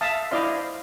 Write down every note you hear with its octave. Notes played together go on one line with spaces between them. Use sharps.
E5 F5 A5 D#6
E4 C5 D5 D#5 F5 C6